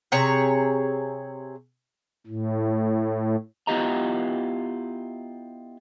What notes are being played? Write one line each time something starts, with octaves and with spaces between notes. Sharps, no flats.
C3 G#4 C#5 A#5
A2
B3 E4 F4 G4 D#5 A#5